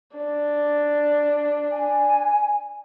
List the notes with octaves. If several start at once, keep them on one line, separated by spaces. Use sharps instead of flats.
D4
G#5